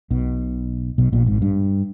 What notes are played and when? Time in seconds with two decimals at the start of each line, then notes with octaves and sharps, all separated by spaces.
0.10 B1 B2
0.98 B1 B2
1.13 A#1 A#2
1.27 G#1 G#2
1.42 G2